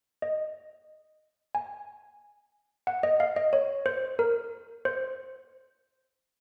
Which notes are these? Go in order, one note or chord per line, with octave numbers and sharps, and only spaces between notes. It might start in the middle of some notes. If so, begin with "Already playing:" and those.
D#5
G#5
F#5
D#5
F5
D#5
C#5
C5
A#4
C5